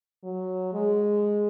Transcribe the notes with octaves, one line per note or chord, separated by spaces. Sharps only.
F#3
G#3